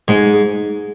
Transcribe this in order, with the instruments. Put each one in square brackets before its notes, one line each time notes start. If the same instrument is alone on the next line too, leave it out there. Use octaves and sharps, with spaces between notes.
[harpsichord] G#2 [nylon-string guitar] G#3